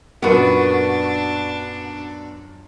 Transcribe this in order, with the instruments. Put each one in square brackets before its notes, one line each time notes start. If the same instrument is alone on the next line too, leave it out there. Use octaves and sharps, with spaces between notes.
[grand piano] F#2 A#2 [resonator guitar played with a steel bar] B3 F#4 [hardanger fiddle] D4 [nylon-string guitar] A#4 B4